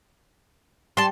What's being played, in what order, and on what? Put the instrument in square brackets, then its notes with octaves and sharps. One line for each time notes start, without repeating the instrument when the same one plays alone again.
[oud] G3 [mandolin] A5 C6